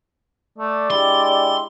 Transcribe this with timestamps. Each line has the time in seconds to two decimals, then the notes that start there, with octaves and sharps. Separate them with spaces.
0.58 A3 D5
0.91 G#3 D4 E4 G4 C6